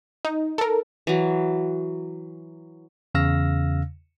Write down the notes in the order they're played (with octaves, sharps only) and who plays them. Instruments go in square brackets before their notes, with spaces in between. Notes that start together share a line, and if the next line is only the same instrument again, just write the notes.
[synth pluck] D#4
A4 A#4
[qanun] E3 F#3
[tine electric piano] E2 C#3 F5 E6 F6 A#6